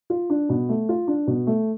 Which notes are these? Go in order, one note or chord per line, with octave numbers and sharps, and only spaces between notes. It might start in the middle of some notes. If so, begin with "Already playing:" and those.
F4
D4
B2
A3
F4
D4
B2
A3